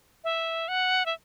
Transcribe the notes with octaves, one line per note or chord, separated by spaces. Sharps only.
E5
F#5
E5